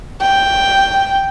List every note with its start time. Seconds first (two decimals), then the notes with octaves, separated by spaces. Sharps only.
0.21 G5